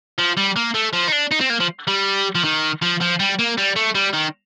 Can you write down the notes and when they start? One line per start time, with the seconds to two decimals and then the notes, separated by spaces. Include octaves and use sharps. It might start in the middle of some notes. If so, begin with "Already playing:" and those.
0.18 F3
0.37 G3
0.56 A#3
0.75 A3
0.93 F3
1.08 D#4
1.12 D4
1.31 D#4
1.41 C4
1.50 A#3
1.60 F3
1.87 G3
2.35 F3
2.44 D#3
2.82 F3
3.01 F3
3.20 G3
3.39 A#3
3.58 G3
3.76 A3
3.95 G3
4.14 D#3